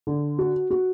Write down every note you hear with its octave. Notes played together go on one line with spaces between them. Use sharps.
D3
F#4
F#4